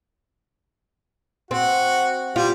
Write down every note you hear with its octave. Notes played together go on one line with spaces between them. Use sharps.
C4 F#4
G3 F4